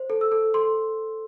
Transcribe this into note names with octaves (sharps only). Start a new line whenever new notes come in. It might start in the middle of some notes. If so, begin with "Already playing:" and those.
Already playing: C5
A4
E6
A4
A4 C6